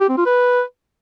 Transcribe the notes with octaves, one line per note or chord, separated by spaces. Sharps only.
G4
C4
F4
B4